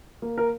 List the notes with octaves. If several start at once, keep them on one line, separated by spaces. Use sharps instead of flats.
A#3
A#4